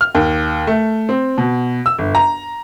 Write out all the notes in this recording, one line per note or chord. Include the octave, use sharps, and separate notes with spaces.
F6
D#2
A3
C4
B2
E6
G1
A#5